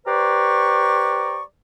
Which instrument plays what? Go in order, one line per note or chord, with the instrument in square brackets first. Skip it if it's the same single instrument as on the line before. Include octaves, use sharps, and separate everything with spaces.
[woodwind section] G4 B4 C5 D5 A#5 C#6